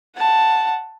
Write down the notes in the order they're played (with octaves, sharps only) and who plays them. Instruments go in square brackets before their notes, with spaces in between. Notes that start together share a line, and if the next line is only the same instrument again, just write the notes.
[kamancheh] F#5 A5